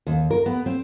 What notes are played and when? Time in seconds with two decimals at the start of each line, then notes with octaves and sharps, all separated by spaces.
0.07 D#2
0.31 A#4
0.46 B3
0.66 C4